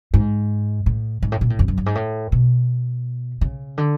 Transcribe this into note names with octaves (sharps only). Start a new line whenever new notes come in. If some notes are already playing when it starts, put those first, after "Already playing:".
G#2
A2
G#2
A2
A#2
A2
F2
F#2
G2
G#2
A2
B2
C#3
D3